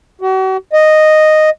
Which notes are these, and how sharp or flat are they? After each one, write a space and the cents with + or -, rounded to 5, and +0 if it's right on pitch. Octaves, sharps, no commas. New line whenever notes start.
F#4 +40
D#5 -5